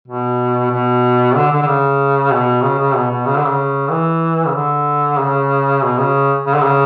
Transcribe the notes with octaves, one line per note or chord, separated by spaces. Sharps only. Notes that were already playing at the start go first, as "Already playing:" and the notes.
B2
B2
D3
D3
D3
C#3
B2
C#3
C#3
B2
B2
C#3
D3
C#3
E3
C#3
D3
C#3
B2
C#3
C#3
D3
C#3